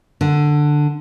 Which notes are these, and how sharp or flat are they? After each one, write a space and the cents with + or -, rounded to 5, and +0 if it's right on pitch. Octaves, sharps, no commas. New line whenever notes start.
D3 +10